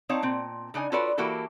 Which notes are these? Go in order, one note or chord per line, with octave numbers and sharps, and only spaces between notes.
C4 D#4 C#5 F5 A5
A#2 C4
C#3 D4 D#4 G#5
F4 F#4 A4 B4 C#5 D5
E3 A#3 E4 F#4 G4 A4